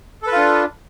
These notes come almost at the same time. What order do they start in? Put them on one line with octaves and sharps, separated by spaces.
A4 B4 F4 D4